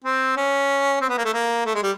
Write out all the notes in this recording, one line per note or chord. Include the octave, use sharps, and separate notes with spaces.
C4
C#4
C4
B3
A#3
A3
A#3
A3
G#3
G3